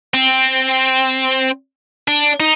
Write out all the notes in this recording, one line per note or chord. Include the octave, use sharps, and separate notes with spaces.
C4
D4
D#4